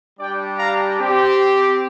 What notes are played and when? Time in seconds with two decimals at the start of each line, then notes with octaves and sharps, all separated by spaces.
0.19 G3 D4 G4 D5 G5
0.59 F5 A#5
1.00 C4 G4